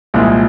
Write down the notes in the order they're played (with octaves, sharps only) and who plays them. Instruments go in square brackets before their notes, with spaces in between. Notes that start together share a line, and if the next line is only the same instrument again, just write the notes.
[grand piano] C2 A#2 F3 G#3 E4